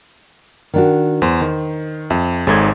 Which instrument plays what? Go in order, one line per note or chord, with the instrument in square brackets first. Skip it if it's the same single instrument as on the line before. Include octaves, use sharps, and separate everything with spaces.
[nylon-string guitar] D#3 D4 F#4
[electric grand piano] E2 [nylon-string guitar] C5
[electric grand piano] D#3
[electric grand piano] F2 [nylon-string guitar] E5
[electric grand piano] G#1 G#2 G#6 [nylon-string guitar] G#4 A4 C#5